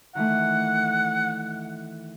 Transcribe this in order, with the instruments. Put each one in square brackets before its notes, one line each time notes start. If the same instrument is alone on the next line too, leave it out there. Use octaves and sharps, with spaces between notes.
[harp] D#3 E3 A3 [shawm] F#5